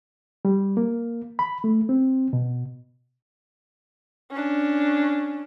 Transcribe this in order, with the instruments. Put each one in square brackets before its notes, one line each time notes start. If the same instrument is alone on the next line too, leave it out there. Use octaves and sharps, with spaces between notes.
[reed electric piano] G3
A#3
B5
A3
C4
B2
[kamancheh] C#4 D4